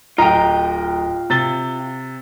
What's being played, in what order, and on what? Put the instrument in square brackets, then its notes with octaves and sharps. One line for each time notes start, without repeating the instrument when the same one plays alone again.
[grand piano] D1 D#5 A#5 [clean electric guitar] F4 G5
[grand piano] C3 A6 G7